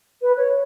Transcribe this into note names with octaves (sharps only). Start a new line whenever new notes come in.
B4
C#5